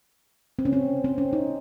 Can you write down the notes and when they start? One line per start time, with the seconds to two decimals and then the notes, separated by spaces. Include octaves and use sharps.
0.59 C4
0.65 C#4
0.73 C4
1.04 C4
1.18 C#4
1.33 D#4